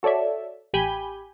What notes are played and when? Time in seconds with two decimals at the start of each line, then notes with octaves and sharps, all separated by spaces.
0.03 F#4 A4 C#5 D5 E5
0.73 A1 G4 G#5 B5 G6 D#7